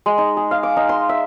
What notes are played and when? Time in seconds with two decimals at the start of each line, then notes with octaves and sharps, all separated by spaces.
0.06 G#3
0.18 D#4
0.37 G#4
0.51 F5
0.63 D6
0.77 D#4
0.89 C6
1.09 E5